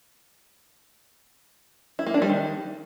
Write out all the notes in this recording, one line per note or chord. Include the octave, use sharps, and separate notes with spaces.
E4
A#3
D4
G3
D#3